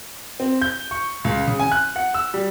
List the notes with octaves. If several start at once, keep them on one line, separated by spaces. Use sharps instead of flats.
C4
G6
C#6
C#2
C#3
G#5
F#6
F#5
E6
G3